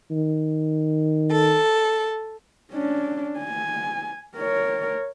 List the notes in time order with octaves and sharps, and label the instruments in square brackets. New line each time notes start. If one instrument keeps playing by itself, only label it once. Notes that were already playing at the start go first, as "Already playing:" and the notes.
[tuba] D#3
[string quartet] A4
[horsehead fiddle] C#4 D4
G#5
A#4 C#5